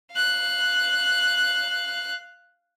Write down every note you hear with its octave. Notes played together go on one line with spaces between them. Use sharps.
F5 F#6